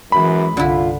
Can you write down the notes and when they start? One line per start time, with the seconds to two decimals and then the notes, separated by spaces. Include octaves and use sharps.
0.12 F#2 E3 G#3 B5
0.57 C2 G2 D3 E4 F4